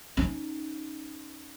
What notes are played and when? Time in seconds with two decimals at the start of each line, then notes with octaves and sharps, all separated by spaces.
0.17 C#4 D#4